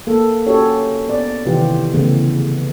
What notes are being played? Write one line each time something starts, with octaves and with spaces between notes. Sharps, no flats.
A#3 A4
C#4 F#4 G4 A4 C#5
B3 D5
C3 D#3 E3 F4 G4
C#3 E3 A3 B3